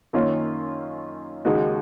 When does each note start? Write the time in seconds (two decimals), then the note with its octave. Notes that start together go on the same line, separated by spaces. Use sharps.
0.13 F#2 D#3 A#3 C#4 F4
1.45 D#2 C#3 G#3 D#4 F#4